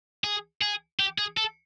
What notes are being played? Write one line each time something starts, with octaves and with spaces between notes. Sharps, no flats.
G#4
G#4
G4
G#4
A4